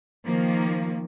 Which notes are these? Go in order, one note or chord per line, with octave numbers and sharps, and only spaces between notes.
D#3 F3 A#3